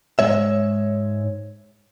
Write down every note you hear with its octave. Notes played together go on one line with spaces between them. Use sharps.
G#2 E3 G#3 C#5 E5